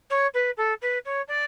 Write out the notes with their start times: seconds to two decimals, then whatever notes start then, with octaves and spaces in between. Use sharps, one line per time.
0.10 C#5
0.34 B4
0.57 A4
0.81 B4
1.05 C#5
1.28 D5